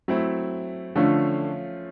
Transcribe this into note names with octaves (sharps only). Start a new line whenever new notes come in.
F#3 A3 C4 E4
D3 F3 A3 C#4 F4